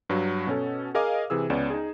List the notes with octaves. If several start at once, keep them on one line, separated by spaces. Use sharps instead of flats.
G2 F#3 F#4
B2 C#4 A4
G#4 A#4 D#5 F5 G#5 D6
C3 E3 G#4 E6
C#2 B3 C#4 D5 E7
D#4 G#4